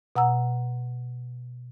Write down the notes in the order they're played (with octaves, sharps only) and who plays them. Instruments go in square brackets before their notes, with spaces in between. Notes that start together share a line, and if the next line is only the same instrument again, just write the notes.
[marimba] B2 F#5 A#5 E6